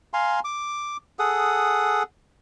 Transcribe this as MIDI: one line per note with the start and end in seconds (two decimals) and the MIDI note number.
0.14 0.40 77
0.14 0.40 80
0.14 0.40 82
0.14 0.40 84
0.44 0.97 86
1.19 2.03 68
1.19 2.03 69
1.19 2.03 78
1.19 2.03 87